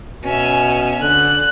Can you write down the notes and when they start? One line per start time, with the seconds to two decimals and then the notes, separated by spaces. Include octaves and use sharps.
0.24 B2 C#4 E5
1.01 D3 F#6